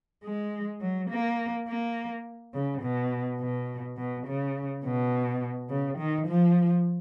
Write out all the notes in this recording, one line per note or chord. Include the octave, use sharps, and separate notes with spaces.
G#3
F#3
A#3
A#3
C#3
B2
B2
B2
C#3
B2
C#3
D#3
F3